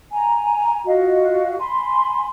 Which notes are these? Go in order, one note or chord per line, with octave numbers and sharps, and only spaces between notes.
G#5 A#5
F4 F#4 D#5 F5
G#5 B5 C6